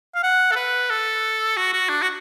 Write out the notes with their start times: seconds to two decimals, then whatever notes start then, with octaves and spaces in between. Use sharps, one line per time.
0.15 F5
0.23 F#5
0.51 A4
0.56 B4
0.90 A4
1.57 F#4
1.73 F#4
1.89 D4
2.02 F#4